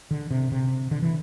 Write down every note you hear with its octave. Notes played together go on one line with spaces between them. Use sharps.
D3
C3
C3
D3
E3